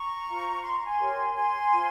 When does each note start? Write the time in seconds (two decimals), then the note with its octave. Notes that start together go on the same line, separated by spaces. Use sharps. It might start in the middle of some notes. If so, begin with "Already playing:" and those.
Already playing: A#5 C#6
0.27 F4 C5
0.63 C6
0.74 A#5
0.85 G#5 C6
0.99 G4 A#4 C#5
1.36 G#5 C6
1.73 F4 C5